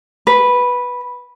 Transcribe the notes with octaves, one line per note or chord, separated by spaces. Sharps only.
B4